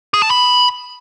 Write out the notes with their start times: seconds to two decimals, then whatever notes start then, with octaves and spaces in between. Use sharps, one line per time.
0.14 G#4
0.22 A5
0.30 B5